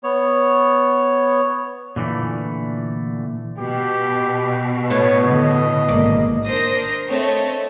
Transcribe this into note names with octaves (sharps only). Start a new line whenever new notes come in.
B3 C#5
A#2 D3 E3 A3
B2 G4
A2 B3 C#5
D3 D#5
G#1 A#3 D5
D4 A#4 C5 D#6 A#6
A3 C4 C#5 D#5